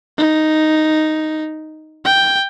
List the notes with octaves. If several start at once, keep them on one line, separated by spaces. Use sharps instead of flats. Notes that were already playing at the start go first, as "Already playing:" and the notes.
D#4
G5